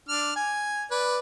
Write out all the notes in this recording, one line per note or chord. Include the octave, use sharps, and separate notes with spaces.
D4 F6
G#5
B4 D5